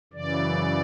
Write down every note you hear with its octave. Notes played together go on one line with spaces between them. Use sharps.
F#2 C#3 E3 D5